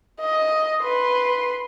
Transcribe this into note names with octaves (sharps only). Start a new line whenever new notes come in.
D#5
B4 C6